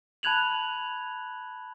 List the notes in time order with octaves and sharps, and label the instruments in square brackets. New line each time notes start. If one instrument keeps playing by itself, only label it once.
[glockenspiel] A5 B5 F#6 G#6 F7 F#7